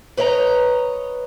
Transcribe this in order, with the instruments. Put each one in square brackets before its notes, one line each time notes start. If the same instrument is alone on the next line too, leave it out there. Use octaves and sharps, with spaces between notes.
[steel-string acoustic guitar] B4 C#5 D#5 G5 A#5